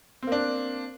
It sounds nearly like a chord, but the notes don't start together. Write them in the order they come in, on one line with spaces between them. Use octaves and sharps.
C4 A#3 D4